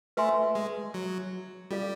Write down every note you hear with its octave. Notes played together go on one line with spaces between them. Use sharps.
A3 B4 E5 G#5 C6
G#3
F#3
G3 C#4 F4 A4 D5 F5